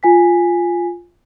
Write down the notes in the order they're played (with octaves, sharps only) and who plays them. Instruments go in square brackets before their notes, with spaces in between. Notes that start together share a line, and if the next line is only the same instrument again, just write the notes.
[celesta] F4 G#5 B6